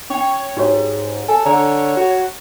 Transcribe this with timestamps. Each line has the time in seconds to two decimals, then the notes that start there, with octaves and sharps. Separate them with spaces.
0.10 C#4 C#5 G5
0.57 G#2 F#4 G4 C#5
1.28 A4 G#5
1.45 D3 C#5 A#5
1.97 F#4